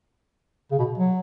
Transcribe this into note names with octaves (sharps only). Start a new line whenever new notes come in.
C#3
B2
F#3